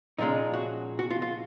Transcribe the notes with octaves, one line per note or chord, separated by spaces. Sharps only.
A#2 F3 G#3 C#4 D#4
F#4
F#4
F4
F4